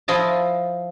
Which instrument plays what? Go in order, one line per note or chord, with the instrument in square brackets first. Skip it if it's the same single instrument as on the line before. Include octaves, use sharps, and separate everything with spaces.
[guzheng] F3 E4 D#5 A5